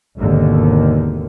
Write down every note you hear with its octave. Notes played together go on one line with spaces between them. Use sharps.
G#1 D#2 G#2 B2 D3 D#3